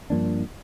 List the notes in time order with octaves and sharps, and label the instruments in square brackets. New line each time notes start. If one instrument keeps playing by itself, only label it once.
[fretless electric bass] G2 F3 A#3 D4